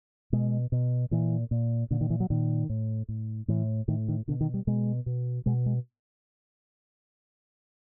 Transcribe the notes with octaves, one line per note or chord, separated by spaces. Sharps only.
B2 G#3
B2
A#2 E3
A#2
A#2 D3
D#3
E3
F#3
A#2 D#3
A2
A2
A2 E3
A2 D#3
D#3
B2 D3
D#3
G3
B2 G#3
B2
B2 G#3
G#3